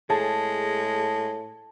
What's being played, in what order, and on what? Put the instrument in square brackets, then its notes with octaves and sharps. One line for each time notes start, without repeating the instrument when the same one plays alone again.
[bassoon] A2 [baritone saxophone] G#3 [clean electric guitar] G#4 [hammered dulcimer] A5